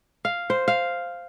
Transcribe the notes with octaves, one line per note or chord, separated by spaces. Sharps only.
F5
C5
F5